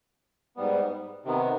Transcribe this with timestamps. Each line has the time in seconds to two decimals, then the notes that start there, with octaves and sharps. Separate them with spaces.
0.56 G#2 G3 B3
1.25 C3 D#3 B3